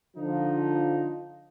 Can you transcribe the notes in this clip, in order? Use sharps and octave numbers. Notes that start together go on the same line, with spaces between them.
D3 F3 D#4